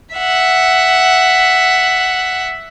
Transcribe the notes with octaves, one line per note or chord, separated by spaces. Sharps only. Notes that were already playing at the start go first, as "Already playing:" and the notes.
E5 F#5